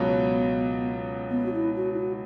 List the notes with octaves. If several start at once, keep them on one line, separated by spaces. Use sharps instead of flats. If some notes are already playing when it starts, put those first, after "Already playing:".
Already playing: C#2 B2 F#3 B3
B3
F#4
E4
F#4
E4
F#4